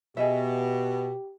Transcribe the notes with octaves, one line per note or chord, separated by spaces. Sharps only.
B2 G4 G#4 D#5 E5